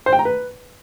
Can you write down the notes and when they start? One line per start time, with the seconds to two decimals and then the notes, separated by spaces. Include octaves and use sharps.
0.06 C5
0.13 G5
0.19 A#5
0.25 B4